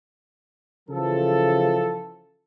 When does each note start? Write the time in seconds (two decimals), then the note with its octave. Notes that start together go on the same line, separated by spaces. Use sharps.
0.89 C#3 E3 F3 A4